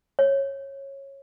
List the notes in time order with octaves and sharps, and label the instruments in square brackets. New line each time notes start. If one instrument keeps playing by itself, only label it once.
[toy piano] C#5